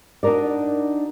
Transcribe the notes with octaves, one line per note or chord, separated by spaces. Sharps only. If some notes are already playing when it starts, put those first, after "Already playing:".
D4 D#4 F#4 A#4 D5